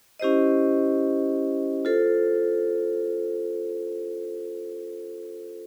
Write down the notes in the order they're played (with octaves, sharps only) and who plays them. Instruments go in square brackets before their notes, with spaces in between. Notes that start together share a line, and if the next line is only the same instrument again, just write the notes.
[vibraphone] C#4 E4 G4 C5 D#5
F4 A4 C5